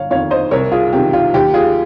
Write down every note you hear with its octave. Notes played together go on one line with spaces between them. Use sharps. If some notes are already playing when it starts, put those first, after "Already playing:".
Already playing: G1 C#5 F5
F2 D#3 C#5 F5
C5 D#5
C2 A#4 C#5
F4 G#4
C3 D#3 G4
F4
D#2 G4
F4 G#4